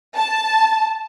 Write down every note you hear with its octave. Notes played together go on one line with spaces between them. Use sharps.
A5